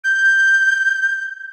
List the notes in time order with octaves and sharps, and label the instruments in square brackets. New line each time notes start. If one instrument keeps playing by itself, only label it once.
[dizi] G6